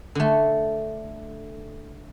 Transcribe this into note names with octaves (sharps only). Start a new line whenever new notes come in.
D3 A3